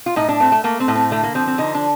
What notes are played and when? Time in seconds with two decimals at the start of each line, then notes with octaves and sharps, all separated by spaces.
0.06 F4
0.16 A2 D#4
0.29 D4
0.40 A3 C4
0.52 A3
0.64 A3 A#3
0.80 C4
0.88 A2
0.95 C4
1.11 D3 A3
1.24 A#3
1.35 F3 C4
1.47 C4
1.58 D3 D#4
1.75 D4